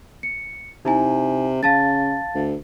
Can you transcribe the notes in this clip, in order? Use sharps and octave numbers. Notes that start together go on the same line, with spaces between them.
C#7
C3 D#4 E4 G#5
C#3 F5 A5 A6
D2